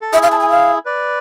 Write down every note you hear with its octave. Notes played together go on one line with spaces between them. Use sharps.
A4
E4 G#4 E5
F5
A5
G#5
F5
B4 D5